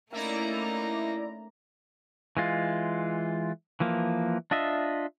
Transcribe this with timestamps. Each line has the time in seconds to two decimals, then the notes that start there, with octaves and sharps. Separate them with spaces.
0.12 A3 A#3 C#4 D#4 E4 D5 A#5
2.37 E3 G#3 F4
3.80 E3 F3 A#3
4.51 D4 F4 D#5 E5